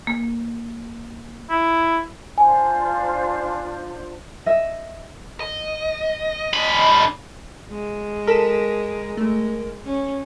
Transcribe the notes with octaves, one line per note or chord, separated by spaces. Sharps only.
A#3
E4
D4 F4 C5 G#5
D#5 E5
D#5
D3 B5
G#3
A4 A#4 B6 E7
G#3 A3
C#4